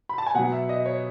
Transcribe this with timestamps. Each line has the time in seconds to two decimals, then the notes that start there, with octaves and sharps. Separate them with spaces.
0.09 B5
0.18 A5
0.27 G#5
0.35 B2 F#3 F#5
0.52 E5
0.69 D#5
0.86 C#5